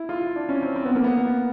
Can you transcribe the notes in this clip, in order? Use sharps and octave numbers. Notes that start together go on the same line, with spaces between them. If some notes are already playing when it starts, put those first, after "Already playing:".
Already playing: E4
F4
D4
C#4
C4
C4
B3
A#3
B3